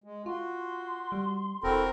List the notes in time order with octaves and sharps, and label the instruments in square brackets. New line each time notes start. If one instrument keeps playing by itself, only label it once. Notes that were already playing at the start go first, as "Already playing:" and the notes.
[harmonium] G#3
[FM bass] F4 [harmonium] F#4 [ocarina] C6
[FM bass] G3
[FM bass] E1 [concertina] C4 A#4 [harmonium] E4 F#4 A4